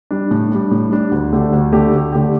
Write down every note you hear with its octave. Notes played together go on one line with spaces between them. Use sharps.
G3 D4
A2
G3 D4
A2
G3 D4
D2
D3 A3 G4
D2
D3 A3 G4
D2
D3 A3 G4